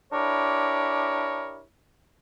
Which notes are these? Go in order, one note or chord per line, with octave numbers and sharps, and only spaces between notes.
D4 E4 G4 A#4 C#5